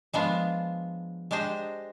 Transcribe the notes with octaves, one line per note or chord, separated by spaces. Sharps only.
F3 G#3 B3 D4 F4
G#3 D4 G4 C5 D#5